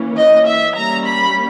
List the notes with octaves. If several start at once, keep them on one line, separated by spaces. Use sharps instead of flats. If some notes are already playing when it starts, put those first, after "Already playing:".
Already playing: E3 A#3 C#4
D#5
E5
G3 A#3 C#4 A#5
B5